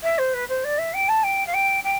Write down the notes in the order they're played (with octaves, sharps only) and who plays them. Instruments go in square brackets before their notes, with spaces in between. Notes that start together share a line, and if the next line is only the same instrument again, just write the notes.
[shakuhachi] E5
C5
B4
C5
D5
E5
G5
A5
G5
F5
G5
G5